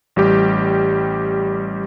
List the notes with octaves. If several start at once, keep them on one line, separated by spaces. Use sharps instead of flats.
A1 G3 G4